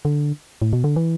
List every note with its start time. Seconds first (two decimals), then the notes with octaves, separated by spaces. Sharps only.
0.05 D3
0.62 A2
0.73 B2
0.84 D3
0.96 E3